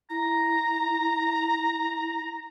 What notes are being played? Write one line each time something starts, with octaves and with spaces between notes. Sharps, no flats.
E4 A#5